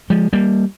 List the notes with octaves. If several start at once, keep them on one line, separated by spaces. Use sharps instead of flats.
F3 G#3
G3 A#3